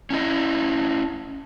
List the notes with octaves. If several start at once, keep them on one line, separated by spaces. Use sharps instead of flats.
C#4 E4 D#5